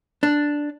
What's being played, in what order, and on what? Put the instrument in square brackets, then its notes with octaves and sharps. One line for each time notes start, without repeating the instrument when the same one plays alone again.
[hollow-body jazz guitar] D4